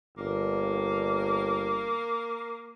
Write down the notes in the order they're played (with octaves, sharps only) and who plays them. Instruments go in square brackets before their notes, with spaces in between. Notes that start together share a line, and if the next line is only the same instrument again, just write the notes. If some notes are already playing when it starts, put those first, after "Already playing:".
[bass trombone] G1 [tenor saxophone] A#3